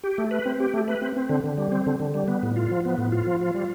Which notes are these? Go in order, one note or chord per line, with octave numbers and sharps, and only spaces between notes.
G4
A3
B4
C4
G4
A3
B4
C4
C4
D3
D3
G3
C4
D3
D3
G3
B3
A2
F4
F3
B3
A2
F4
F3
F4
G3